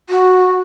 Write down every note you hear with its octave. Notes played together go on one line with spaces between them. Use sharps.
F#4